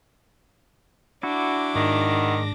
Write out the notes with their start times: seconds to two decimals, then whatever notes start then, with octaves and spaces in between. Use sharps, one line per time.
1.23 D4 E4 F#4 D6
1.75 G#2 D#3 A#6